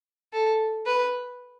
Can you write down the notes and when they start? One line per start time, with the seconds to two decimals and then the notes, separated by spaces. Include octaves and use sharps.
0.33 A4
0.86 B4